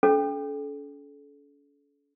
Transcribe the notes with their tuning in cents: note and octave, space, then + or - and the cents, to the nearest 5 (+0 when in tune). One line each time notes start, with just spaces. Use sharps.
C#4 +40 A4 -35